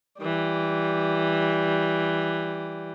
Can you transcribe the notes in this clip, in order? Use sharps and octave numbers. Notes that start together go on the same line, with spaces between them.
E3 G3